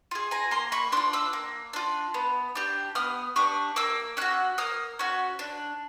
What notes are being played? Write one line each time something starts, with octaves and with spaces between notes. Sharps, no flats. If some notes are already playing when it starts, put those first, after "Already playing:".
F4 G#4
G#5 A#5
A#3 A#5 C6
B5 C#6
D4 F4 C6 D6
D6 E6
A#3
D4 F4
B3
D4 G4
B3 D#6 F6
D4 G4 C#6 D#6
A#3 D6 E6
C#4 F#4 E6 F#6
A#3 D#6 F6
C#4 F#4
D4